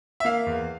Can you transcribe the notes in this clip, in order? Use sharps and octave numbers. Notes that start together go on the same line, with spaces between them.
E5
A#3 F5
E2